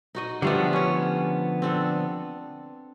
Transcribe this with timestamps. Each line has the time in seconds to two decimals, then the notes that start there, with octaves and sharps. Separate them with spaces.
0.15 D#4 F#4 D#5
0.42 D3 F3 G3 A3 B3 D4
0.73 C#4 C#5
1.62 C4 D4 A4